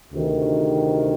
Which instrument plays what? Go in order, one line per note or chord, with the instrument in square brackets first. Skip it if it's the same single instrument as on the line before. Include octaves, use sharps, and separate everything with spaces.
[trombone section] D2 C3 D#3